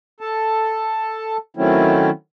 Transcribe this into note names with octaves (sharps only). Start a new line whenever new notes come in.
A4 A5
D#3 F#3 A3 C4 C#4 E4